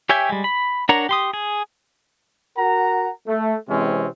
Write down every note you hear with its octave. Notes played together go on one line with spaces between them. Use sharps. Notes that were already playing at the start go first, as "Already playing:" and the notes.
G4 C#5 E5 G5 G#5
G3 G#3
B5
D4 A#4 C#5 F#5 A#5
G4 C6 D#6
G#4
F#4 A#4 F#5 A#5
A3
C3 E3 G#3 C4 C#4